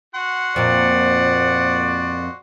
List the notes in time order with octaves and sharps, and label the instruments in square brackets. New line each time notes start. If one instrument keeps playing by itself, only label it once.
[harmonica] F#4 F#5 C6
[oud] F2 A#2 [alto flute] C5 [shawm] D5